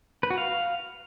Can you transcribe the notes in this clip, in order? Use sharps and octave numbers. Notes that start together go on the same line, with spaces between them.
B4
F#4
F5